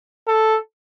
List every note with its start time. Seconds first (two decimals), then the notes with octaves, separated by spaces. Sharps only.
0.28 A4